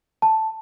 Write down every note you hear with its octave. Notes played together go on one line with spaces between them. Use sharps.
A5